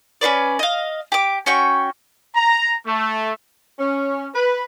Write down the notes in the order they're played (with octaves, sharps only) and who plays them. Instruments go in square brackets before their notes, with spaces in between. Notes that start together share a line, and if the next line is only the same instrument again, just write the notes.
[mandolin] C#4 F4 B4 D5
D#5 F5
G4 D6
C#4 F#4 G5 C#6
[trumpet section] A#5
A3
[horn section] C#4
B4